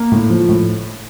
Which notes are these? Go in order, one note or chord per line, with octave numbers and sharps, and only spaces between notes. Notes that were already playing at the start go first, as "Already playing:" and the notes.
Already playing: A#3
A2
F3
A2